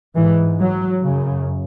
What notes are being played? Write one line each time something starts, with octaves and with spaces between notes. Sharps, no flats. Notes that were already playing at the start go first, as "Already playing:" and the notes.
G#2 E3
F#3
F#2 C#3